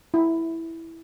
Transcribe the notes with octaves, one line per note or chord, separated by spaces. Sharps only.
E4